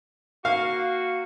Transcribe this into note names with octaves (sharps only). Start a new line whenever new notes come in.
A#3 F#4 F5